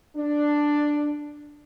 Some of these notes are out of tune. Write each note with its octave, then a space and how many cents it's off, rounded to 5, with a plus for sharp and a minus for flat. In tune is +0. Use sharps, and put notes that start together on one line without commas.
D4 +5